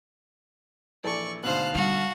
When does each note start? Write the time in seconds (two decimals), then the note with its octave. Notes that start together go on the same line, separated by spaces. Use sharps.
1.04 A#1 E3 A4 D5 C#6
1.43 D2 G#2 B2 C5 F5 A5 F#6
1.75 D3 G3 F#4